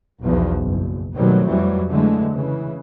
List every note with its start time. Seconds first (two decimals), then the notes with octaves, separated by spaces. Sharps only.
0.23 B1 E2 F3
0.61 F#1
1.15 B2 D#3 F#3 G3 A3 C4
1.47 F2 E3 F#3 G3
1.89 D3 E3 F#3 G#3 A3
2.29 C#3 E3